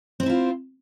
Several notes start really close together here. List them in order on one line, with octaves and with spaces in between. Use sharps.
C4 C5 E4 F4